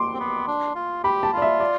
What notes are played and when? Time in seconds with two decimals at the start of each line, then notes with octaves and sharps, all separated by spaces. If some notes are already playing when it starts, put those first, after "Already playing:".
Already playing: C6 D6
0.14 C4
0.20 B3
0.48 D4
0.75 F4
1.04 G4 B5
1.23 A5
1.33 F4 D5
1.42 E5
1.60 D5